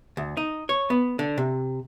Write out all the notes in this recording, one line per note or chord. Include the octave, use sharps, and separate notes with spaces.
D2
D#4
C#5
B3
D3
C3